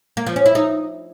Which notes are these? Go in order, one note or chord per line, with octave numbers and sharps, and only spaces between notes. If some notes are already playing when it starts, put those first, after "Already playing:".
A#3
F3
C#4
E4
D#4